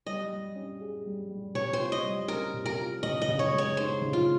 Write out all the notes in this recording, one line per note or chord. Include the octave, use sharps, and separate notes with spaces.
G3 D#5
G3
C#4
G#4
G3
G3
C3 C#5
C5
F4
D#5
G3
C#4 A#4
C3
A#4
F4
C#3 D#5
D#5
C#3
C#5
G#3
C#5
D#4 C5
C#3
F4